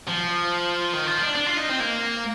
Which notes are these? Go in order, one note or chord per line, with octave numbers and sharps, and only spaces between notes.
F3
D#3
F3
D4
D4
F4
D#4
C4
A#3